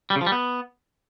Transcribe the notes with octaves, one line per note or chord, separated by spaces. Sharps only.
G3
C#3
F3
G3
B3